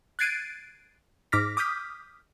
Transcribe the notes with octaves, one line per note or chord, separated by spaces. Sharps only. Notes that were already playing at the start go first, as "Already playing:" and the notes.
F#6 G#6 A6 C7 D7 D#7
G#2 D6 F6 A#6 B6
D6 D#6 F6 G6 B6